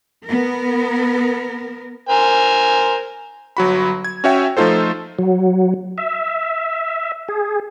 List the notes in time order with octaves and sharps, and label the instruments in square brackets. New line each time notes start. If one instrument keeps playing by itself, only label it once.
[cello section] B3 A#4
[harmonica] A#4 C5 G#5
[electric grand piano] G1 F#3 F#4 B5
G#6
C#4 F#4 C#5 E5 G5
F3 A3 D#4 F4 A4 C5
[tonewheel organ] F#3
E5
G#4